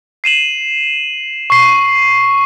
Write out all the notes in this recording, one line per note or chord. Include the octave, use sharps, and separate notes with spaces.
C7 D#7 E7 F#7
C#6 C7